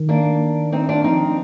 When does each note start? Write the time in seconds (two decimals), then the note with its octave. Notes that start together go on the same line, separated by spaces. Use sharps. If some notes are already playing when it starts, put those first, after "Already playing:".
Already playing: D#3
0.09 A#3 D4
0.72 C4 D#4
0.89 D4 F4
1.04 F3 C4 D#4